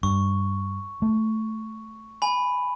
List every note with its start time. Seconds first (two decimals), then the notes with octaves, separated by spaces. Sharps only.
0.03 G2 C#6
1.02 A3
2.22 G#5 B5